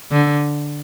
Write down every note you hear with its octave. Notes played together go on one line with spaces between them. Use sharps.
D3